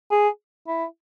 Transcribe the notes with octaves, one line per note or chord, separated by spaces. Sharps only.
G#4
E4